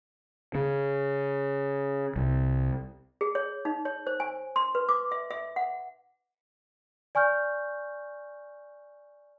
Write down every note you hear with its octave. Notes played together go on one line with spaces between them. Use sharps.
C#3
C2
G#4
C#5
D#4
C#5
C5
G#5
C6
B4
D6
E5
E5
F#5
D5 G#5 C#6 F6 G6